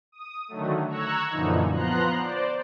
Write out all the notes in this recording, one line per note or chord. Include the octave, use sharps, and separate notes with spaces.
D#6
D3 D#3 F#3 A3
A#5 C#6 E6 F#6 G#6
F#2 A#2 D3 E3 F3 D#4
F3 B3 A#5 C6 F#6
C5 D5